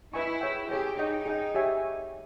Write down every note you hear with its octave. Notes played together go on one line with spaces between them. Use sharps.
E4 B4 D#5 G#5 C#6
G#4 C#5 G5
G4 G#4 C#5 G5
D#4 G#4 D#5 G5
G#4 D#5 G5
G4 C#5 E5 G#5